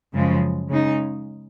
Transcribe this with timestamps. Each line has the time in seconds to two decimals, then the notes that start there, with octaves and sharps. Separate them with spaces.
0.13 F#2 C#3 F3 G#3
0.69 C#3 G#3 D#4